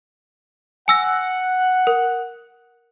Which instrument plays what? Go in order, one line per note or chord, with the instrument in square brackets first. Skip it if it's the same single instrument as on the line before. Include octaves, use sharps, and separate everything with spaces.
[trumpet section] F#5 [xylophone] G#5 E6 A#6
[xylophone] A#4